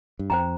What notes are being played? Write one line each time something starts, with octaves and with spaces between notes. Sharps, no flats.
G2
F2 C5 G5 A#5